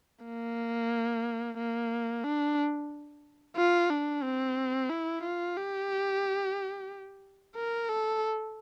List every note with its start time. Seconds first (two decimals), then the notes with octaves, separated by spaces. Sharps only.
0.25 A#3
1.58 A#3
2.24 D4
3.57 F4
3.90 D4
4.23 C4
4.90 E4
5.23 F4
5.56 G4
7.55 A#4
7.88 A4